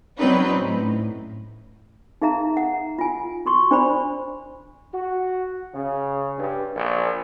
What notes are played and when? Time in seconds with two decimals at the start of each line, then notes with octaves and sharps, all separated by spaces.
0.17 F#3 C4 C#4 D#4 B4 D5
0.60 A2
2.22 D#4 G#4 E5 F5 A#5
2.57 F#5
2.98 F4 G#5
3.46 F#4 C6 C#6
3.71 D4 C5 D5 B5
4.93 F#4
5.73 C#3
6.38 G2
6.76 A#1